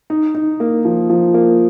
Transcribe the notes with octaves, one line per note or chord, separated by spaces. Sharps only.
D#4
D#4
A#3
F3
F3
A#3